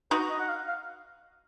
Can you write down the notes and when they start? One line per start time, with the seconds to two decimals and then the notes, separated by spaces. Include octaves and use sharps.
0.11 D#4 F#4 B4
0.30 D#5
0.40 F#5
0.49 F5
0.68 F5